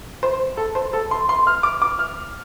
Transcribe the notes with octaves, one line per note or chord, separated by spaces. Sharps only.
C5
A4
C5
A4
C6
C6
F6
D6
D6
F6